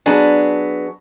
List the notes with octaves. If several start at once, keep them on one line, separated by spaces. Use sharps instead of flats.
F#3 B3 D4 G#4